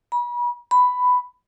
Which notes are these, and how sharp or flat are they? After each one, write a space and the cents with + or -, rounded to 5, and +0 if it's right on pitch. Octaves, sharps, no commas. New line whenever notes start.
B5 -35
B5 +10